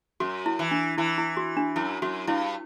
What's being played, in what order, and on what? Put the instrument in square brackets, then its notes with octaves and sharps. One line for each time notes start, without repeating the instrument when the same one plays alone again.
[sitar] F#2 [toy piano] F#4
[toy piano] E4
[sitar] E3
[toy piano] D4
[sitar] E3 [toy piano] E4
[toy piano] E4
F#4
D4
[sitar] F#2 [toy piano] E4
[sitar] F#2 [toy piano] F#4
[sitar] G2 [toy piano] E4